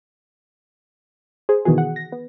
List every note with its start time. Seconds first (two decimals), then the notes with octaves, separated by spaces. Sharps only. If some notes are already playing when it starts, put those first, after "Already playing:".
1.49 G#4 C5
1.65 B2 D#3 E3 B3 F#4 G#4
1.78 F#5
1.96 A#6
2.12 B3